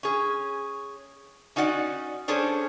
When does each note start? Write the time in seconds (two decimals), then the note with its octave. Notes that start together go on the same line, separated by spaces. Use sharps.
0.03 C#4 G#4
1.56 C#4 D#4 F#4 D5 F#5
2.28 C#4 D4 G#4 A4 C5 C#5